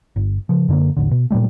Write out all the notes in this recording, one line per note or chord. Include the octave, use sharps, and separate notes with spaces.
G1
C#3 F3
F#2 D3 G#3 A#3
E1 A1 D#2 D3
B2
A#2 F#3 G3 A3